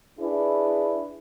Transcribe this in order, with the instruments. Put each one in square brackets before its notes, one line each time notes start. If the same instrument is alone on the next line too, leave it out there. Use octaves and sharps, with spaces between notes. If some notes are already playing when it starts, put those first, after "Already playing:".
[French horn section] D4 E4 G#4 B4